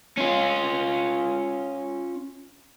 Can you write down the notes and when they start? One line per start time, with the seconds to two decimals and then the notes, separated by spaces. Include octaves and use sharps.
0.17 C#4 F4